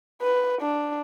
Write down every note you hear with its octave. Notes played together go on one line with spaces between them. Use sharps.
B4
D4